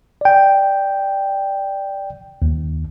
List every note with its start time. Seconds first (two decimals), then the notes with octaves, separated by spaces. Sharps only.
0.21 D5 G5
2.42 D#2